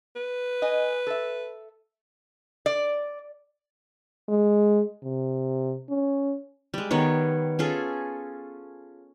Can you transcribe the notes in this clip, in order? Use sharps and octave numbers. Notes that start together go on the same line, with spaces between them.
B4
D#5 G#5
A4 E5
D5
G#3
C3
C#4
G3 G#3
D#3 G3 B3 C#5
C#4 F4 G#4 A4